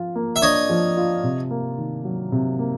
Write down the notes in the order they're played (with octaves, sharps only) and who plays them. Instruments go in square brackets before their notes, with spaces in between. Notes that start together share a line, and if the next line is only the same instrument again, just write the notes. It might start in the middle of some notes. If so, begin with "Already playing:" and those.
Already playing: [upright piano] F3 F4
A#3
[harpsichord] E5
[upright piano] D4 [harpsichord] C#5 D#5
[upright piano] F3
F4
C3
A#3
D#3
F#3
C3
A#3